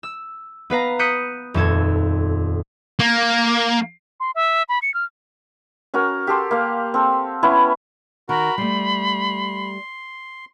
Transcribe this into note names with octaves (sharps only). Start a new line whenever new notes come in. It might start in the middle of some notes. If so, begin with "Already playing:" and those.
E6
B3 B4 F5 A#5
D#6 F#6 G6 B6 C#7 D#7
D#1 F2 A4 G#6
A#3
C6
E5
B5
C#7
F6
C#4 F#4 A#4
G4 A4 C6
A#3 F5
C4 A4
B3 C#4 E4
D#3 F#4 A#4 B5
G3 A3 C6